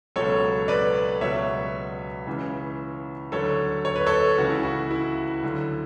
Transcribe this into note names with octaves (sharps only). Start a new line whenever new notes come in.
C#2 B2 F#3 A4 C#5
B4 D5
C#2 B2 F#3 C#5 E5
C#2 C#3 E3
D2 D3 F#3 A4 C#5
C#5
B4
A4 C#5
C#2 C#3 E3 F#4
E4
F#4
E4
D2 D3 F#3